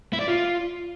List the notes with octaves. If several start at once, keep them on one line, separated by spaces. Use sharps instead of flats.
E4
D5
F4